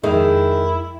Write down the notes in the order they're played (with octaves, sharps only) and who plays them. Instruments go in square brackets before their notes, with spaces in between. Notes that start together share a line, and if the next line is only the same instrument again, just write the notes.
[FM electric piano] F2 G#3 [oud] D#3 [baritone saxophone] E4 [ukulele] G#4 E5